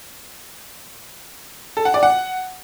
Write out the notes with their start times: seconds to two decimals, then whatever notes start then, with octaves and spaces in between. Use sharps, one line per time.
1.77 A4
1.85 F#5
1.94 D5
2.03 F#5